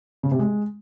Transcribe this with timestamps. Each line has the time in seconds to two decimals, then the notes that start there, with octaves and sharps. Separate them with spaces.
0.23 C#3
0.31 C3
0.39 G#3